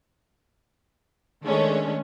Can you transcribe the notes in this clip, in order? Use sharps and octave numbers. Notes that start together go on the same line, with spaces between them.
D#3 G#3 A3 C#4 D4